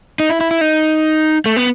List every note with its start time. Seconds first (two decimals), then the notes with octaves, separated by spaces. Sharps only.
0.20 D#4
0.29 E4
0.41 E4
0.51 E4
0.61 D#4
1.46 A3
1.57 B3